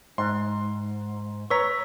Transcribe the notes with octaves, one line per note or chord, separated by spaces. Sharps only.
G#2 C6
B4 C#5 A#5 C#6 E6 B6